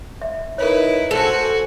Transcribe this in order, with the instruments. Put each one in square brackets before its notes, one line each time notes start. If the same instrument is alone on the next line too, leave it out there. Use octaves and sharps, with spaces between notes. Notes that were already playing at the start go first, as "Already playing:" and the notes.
[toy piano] E5
[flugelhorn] D#4 [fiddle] E4 B4 [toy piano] A#4 C#5
[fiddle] F#4 G#5 [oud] A4 [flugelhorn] C5